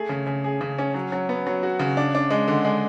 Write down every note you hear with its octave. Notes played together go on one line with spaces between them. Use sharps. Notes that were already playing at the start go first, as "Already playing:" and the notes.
Already playing: A3 G#4
C#3
C#3
G#4
C#3
C#4
F#3
F#3
B3
F#3
F#4
C#3
D4
D4
G#3
D3
G#3